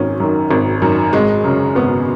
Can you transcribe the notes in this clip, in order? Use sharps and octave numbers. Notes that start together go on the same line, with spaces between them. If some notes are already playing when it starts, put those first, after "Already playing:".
Already playing: G#1 F#2 D#3 C#4
F#2 D#3
G#1
F#2 D#3
G#1 G#3
F#2 C#3
G#1 B3